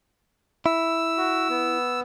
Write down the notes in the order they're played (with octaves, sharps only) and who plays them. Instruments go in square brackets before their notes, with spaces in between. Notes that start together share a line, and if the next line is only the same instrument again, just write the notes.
[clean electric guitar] E4 [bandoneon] E6
[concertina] F#4
B3